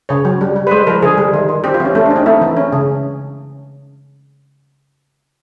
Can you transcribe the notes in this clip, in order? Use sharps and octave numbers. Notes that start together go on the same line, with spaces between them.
C#3 C#5
F#3
G3
G3
B4
G#3 C5
F3 A#4
D3 G#4
G3
D#3
D#3
C4 G4
F4
E3 C#4
A3 C#4
D4
C4
D#4
A3 E4
E3
C#4
C#3